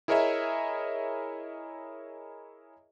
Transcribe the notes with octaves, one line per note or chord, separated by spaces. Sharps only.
E4 G#4 A#4 C#5 D#5 E5